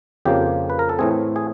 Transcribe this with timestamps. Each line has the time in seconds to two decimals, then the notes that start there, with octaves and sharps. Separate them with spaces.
0.25 F2 C#3 F3 A#3 G4
0.70 B4
0.79 A#4
0.89 A4
0.99 A2 E3 A3 C4 G#4
1.36 G#4